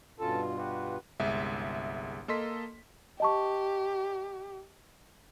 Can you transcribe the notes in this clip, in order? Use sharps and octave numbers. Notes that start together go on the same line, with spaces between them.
G2 B2 C#4 F4 A4
F#4 G4 B4
G1 C2 G#3 E5
A#3 A4 D#5 C6 B6
G4 D#5 A5 C#6